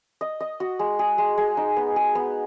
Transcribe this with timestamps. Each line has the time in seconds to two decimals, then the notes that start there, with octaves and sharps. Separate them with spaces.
0.21 D#5
0.40 D#5
0.60 F#4
0.79 G#3
0.99 G#4
1.18 G#3
1.38 G#3
1.57 D#4
1.77 B3
1.96 G#4
2.15 B3